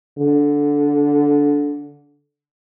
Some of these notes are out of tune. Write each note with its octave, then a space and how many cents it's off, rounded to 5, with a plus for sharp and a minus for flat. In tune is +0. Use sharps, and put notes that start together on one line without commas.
D3 -15